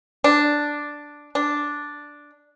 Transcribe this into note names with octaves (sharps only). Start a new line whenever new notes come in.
D4
D4